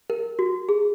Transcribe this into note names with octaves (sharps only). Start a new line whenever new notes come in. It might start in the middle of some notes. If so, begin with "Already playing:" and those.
A#4
F#4
G#4